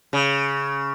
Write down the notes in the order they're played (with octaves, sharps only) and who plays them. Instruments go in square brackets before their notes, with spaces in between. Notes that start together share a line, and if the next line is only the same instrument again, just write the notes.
[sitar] C#3